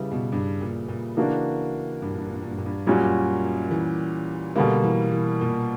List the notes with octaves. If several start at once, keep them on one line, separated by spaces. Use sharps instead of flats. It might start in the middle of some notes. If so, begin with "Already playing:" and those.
Already playing: C#3 G3 B3 E4
B2
G2
A#2
A#2
C#3 E3 A#3 D4 F#4
G2
A#2
G2
A#2
G2
A#2
G2
A#2
G2
F#2 A#2 G3 C#4 F#4
E3
B2 D3 G3 A#3
E3
E3
A#2